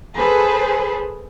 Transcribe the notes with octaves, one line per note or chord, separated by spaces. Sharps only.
G#4 A4 B4 C5